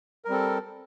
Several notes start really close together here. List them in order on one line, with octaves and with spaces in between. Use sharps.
A#4 G3 C4 A4